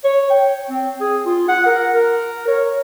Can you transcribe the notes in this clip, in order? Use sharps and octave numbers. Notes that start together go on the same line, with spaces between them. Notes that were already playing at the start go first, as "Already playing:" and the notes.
C#5
G5
C4
G#4
F4
F#5
A#4
A#4
C#5